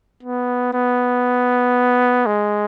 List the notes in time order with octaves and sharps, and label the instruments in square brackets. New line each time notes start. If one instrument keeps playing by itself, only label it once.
[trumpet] B3
B3
G#3